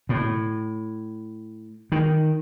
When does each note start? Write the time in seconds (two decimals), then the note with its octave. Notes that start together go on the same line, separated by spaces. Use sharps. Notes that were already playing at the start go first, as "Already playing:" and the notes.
0.09 A2
1.92 D#3